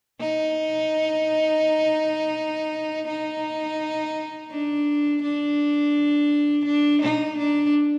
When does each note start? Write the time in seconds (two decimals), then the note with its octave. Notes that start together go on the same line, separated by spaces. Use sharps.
0.21 D#4
3.08 D#4
4.51 D4
5.22 D4
6.65 D4
7.02 D#4
7.38 D4